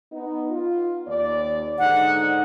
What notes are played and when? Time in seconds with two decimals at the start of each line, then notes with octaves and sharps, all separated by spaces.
0.12 B3 D#4
0.50 F4
1.07 D#2 D5
1.79 G#2 D3 D#4 F#5